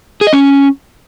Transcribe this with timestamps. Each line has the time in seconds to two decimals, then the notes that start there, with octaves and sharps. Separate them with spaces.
0.21 G#4
0.27 D#5
0.33 C#4